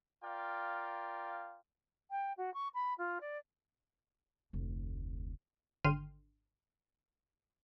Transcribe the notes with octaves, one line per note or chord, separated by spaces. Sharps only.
F4 A#4 D5 F5 G5
G5
F#4
C#6
B5
F4
D5
F1 D2
G#1 D3 G5 C6 F6 D#7